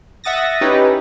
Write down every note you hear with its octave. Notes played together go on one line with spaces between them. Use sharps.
E5 F#5 D#6 A6 A#6
C#4 D#4 E4 G4 B4